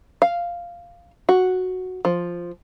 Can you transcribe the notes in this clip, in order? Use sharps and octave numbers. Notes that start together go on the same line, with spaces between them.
F5
F#4
F3